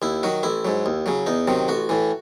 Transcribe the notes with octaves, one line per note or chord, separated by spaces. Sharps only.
D#2 E4
D#3 F#3 F#4
A1 E4
G#2 F#3
D#2
C#3 F#3
E2 D#4
C3 D#3 F#3
A1 F#4
A2 E3